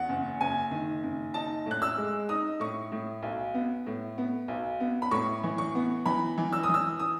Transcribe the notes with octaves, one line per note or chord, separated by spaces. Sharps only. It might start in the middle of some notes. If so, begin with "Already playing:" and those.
Already playing: E2 F#5
F#1
F#1 G#5
D#3
F#1
D#4 A5
A2 F#6
E6
G#3
D#4 D#6
A2 C#6
A2
B1
B3
A2
B3
B1
B3
B5
A2 C#6
E3
C#6
B3
E3 B5
E3
E6
D#6
E3
E6
D#6